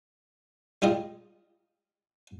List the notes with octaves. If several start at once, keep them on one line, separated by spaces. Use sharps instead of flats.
G3 D#4 F4 G#4 D#5